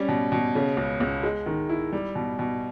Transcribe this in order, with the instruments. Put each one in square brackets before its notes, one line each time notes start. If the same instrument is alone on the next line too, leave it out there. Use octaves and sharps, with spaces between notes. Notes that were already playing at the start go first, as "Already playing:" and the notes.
Already playing: [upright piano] G3 C#4
B2
B2
C#3
C#2
C#2
G#3
D#3
E4
G3
B2
B2